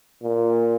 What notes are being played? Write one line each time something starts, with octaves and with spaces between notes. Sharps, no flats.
A#2